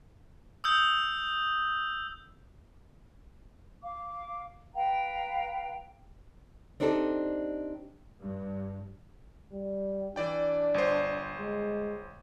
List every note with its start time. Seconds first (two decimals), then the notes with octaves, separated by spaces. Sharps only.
0.64 D#6 E6 G6
3.82 F5 D6
4.74 B4 F5 G5 A#5
6.80 C4 D4 D#4 G4 A4
8.21 G2
9.52 G3
10.16 E3 D4 D5 G5
10.74 G1 C5
11.38 G#3